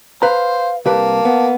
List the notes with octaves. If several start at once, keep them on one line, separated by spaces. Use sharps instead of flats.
B4 C5 F5 A#5
C2 A#3 G4 B4 A5
B3